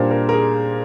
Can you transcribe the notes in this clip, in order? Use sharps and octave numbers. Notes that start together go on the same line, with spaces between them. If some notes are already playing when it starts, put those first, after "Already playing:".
Already playing: A#2 G3 A#3 D4 C5
A#4
A#4
G#4